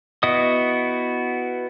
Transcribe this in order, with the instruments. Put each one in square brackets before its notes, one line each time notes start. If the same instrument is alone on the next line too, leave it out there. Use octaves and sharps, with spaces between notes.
[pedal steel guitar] B3 E4 F#4 D#5 D#6